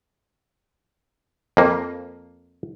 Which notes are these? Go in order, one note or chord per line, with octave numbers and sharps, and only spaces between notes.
F2 A#3